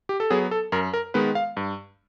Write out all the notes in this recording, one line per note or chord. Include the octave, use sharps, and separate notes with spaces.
G4
A4
F#3 B3 G#4
A4
F#2 A#4
A#4
D#3 G#3 B3 B4
F5
G2